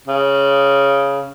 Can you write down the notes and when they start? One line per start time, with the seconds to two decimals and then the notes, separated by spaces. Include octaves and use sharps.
0.08 C#3